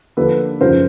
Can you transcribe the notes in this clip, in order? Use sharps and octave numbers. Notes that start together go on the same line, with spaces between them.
D3 F3 A#3 D4 A4 B4
F#2 C#3 F3 G#3 A#4 C5